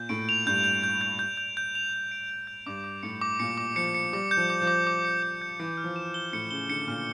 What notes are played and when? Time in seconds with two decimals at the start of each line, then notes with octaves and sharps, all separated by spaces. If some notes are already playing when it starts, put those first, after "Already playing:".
Already playing: A#2 G6
0.09 A2 D7
0.29 F7
0.46 G2 G6
0.64 G6
0.84 G6
1.01 G6
1.19 G6
1.37 G6
1.57 G6
1.75 F7
1.94 F7
2.12 D7
2.30 G6
2.47 G6
2.66 G2 D6
2.84 D6
3.03 A2 C#7
3.21 D6
3.39 A#2 C#7
3.58 D6
3.76 F3 C#7
3.95 C#7
4.13 G3 D6
4.31 G6
4.37 F3
4.50 D6
4.62 F3
4.67 D6
4.87 D6
5.05 C#7
5.23 D6
5.42 G6
5.60 E3 C#7
5.77 F6
5.84 F3
5.96 E7
6.14 G7
6.33 A2 C#7
6.51 C#3 G7
6.69 D3 C#7
6.88 A#2 F6